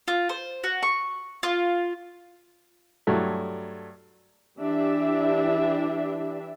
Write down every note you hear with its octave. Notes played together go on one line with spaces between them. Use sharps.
F4
C5
F#4
C#6
F4
G2 F#3 A3
E3 D4 G4 E5